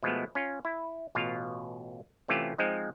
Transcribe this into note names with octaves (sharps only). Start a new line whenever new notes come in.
B2 F3 G#3 A3 B3
C#4 F4
E4
A1 B2 F4 F5
C3 E3 A3 C#4 F4 G4
F3 G#3 C4 D#4